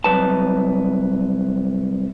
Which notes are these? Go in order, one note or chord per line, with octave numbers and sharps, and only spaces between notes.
C2 F2 F#3 B4 A5